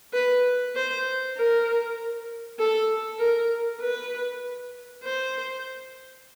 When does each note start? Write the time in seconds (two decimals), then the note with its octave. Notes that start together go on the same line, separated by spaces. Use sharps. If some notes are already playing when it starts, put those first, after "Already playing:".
0.13 B4
0.75 C5
1.36 A#4
2.59 A4
3.19 A#4
3.81 B4
5.04 C5